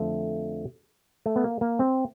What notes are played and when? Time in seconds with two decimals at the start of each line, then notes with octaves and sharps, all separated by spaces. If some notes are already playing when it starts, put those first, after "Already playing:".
Already playing: F2 D3 F3 A3
1.26 A3
1.36 B3
1.44 A#3
1.61 A#3
1.79 C4